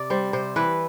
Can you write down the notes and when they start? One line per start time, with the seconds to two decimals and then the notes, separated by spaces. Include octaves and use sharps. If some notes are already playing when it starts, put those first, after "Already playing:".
Already playing: C3 D5
0.10 G3 C5
0.33 C3 C5
0.56 E3 B4